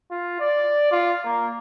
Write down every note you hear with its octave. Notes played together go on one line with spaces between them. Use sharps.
F4
D5
F4
A#3